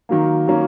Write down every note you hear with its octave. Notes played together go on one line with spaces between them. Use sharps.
D#3 F#3 A#3
D#3 F#3 A#3 C#4